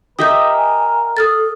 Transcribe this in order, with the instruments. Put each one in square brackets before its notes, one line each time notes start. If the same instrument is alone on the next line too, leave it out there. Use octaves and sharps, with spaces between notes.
[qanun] G4 D#5 E5 [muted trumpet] A#4 [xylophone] D#6 G6
[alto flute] G#5
[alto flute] A4 [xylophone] D#6 F6 A6